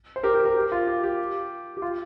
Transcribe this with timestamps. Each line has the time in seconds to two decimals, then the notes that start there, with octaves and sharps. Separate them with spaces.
0.16 C5
0.23 G4 A#4
0.34 G4 A#4
0.45 G4 A#4
0.56 G4
0.72 F4
0.87 G4
1.04 G4
1.77 G4
1.82 F4